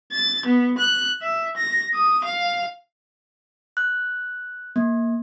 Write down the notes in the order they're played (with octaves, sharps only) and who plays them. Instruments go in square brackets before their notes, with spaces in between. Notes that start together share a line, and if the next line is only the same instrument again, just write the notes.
[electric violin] A6
B3
F#6
E5
A#6
D#6
F5
[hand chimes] F#6
A#3